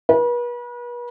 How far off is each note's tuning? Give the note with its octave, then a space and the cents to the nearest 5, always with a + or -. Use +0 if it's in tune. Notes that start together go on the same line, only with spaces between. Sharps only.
B4 -40